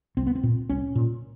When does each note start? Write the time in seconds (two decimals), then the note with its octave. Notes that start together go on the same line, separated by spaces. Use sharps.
0.17 C2 C4
0.27 B3
0.35 C4
0.43 A#2
0.69 C2 C#4
0.95 A#2